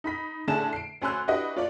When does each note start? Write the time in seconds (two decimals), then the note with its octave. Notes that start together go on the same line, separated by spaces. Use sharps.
0.04 D#4 B5 B6
0.47 A2 D3 A3 G#4 A5 E7
0.73 C7 D7
1.02 D2 C#4 G#5 C6 E6 F#6
1.28 D4 E4 F#4 G4 B4 D#5
1.56 F4 C#5 D5